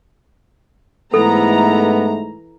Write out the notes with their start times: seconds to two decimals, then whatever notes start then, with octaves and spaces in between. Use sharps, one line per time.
1.14 G#2 E3 A3 B3 A4 A#5